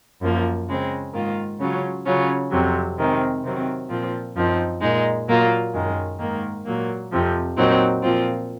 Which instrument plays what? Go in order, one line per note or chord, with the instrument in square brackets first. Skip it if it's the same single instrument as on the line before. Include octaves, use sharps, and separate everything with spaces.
[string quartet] F#2 F3 A#3
C#3 G#3 C4
G#2 D#3 A#3 F4
C#3 F#3 C#4 F4
C#3 F#3 C#4 F4
F2 C3 F#3
C3 D#3 G#3 C4
C3 D#3 F#3 C4
A#2 F3 C4 F4
F#2 F3 C4 D#4
A#2 G#3 D#4
A#2 F#3 A#3 F4
F#2 D#3 G#3
G#2 D#3 A#3
A#2 F#3 A#3
F2 C3 F3
A#2 F#3 C4 D#4
A#2 F3 C4 F4